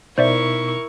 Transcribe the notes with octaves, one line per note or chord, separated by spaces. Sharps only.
B2 D#4 E4 A#4 C5 D5 E5 C#6